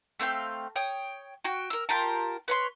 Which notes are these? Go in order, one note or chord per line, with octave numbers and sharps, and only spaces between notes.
A3 C4 F5 G5
C#5 G5 D#6
F#4 G5
A#4 E6
F4 G4 A#4 A5
B4 C#5 C6